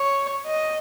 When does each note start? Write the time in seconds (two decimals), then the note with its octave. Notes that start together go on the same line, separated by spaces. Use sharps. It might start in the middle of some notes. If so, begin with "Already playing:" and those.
Already playing: C#5
0.46 D#5